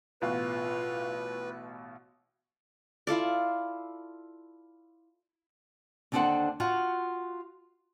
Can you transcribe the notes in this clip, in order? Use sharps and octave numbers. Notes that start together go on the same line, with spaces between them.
A1 B2 F4 B4 F5
E4 F4 A4 D5
D#2 D3 D4 A4 C5 F#5
F4 F#4 F5 F#5